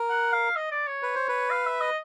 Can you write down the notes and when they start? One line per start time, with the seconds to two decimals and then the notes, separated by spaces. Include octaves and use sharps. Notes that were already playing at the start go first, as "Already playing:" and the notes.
Already playing: A#4
0.10 F#5
0.33 F5
0.56 D#5
0.71 D5
0.87 C#5
1.03 B4
1.15 C5
1.28 B4
1.50 F5
1.66 E5
1.81 D#5